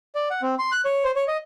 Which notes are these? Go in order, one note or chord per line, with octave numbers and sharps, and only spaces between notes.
D5
F#5
C4
C6
F#6
C#5
C5
C#5
D#5